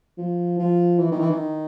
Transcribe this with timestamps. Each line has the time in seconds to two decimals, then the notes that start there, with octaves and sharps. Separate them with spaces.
0.18 F3
0.59 F3
0.99 E3
1.12 D#3
1.20 E3
1.30 D#3